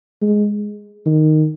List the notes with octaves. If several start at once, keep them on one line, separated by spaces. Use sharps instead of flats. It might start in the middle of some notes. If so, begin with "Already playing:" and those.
G#3
D#3